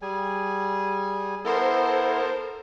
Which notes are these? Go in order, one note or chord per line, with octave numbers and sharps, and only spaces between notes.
G3 G#4 G#5
B3 E4 A4 A#4 C5